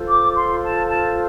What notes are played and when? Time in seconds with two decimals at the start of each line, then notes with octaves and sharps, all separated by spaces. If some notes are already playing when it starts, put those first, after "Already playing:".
Already playing: F4 A4 C5
0.08 D6
0.36 C6
0.63 A5
0.90 A5